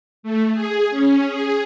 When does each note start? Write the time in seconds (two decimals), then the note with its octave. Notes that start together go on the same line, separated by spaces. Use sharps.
0.23 A3
0.54 G#4
0.90 C#4
1.26 G#4